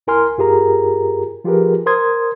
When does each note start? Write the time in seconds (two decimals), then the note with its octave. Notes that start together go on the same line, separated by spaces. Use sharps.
0.07 C2 E4 A#4 G#5 C6 F6
0.38 G2 F4 G4 G#4 A#4 A#5
1.44 F3 F4 G4 G#4 A#4 B4
1.86 A#4 C5 C6 D#6 G#6